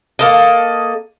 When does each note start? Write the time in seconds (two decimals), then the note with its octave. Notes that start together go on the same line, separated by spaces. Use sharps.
0.19 A#3 A4 D#5